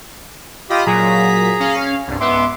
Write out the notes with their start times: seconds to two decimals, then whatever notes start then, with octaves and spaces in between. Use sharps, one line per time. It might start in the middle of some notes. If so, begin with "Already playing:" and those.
0.70 F4 G4 D#5 B5 D#6
0.86 A#2 F#3 G#4 A#5 B6
1.60 C#4 F5
2.07 C2 G2
2.20 G#2 B3 E5 C6 D6